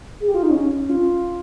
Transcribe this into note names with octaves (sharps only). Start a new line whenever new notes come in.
G#4
G4
F4
D#4
C#4
F4